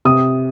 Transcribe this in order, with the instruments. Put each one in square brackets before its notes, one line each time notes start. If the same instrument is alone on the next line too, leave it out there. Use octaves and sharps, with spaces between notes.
[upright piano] C3 D#6